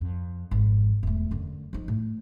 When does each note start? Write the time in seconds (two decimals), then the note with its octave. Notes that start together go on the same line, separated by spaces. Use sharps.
0.01 F2
0.51 G#1 F2
1.03 E1 A3
1.31 F#2 D3
1.73 F3 D#4
1.88 A2